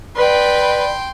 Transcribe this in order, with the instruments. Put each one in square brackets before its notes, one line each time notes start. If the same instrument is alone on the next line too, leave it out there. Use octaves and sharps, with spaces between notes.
[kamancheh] B4 [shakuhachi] D5 [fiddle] G5 C6